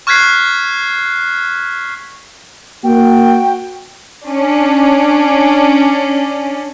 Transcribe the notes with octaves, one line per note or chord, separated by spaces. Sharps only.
C#6 F6 F#6 G#6 B6 C7
A#3 F#4 G5
C#4 D4